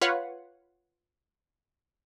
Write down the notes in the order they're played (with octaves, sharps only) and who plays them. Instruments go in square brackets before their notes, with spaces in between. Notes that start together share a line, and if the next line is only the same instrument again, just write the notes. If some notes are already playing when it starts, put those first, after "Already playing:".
[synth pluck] F4 B4 C#5 F5 F#5